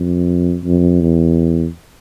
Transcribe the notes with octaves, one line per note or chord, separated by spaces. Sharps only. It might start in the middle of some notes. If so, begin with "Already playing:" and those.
Already playing: F2
F2
E2